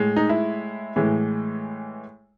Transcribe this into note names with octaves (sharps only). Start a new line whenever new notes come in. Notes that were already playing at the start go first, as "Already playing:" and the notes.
Already playing: A2 G#3
D#4
E4
A2 E3 G#3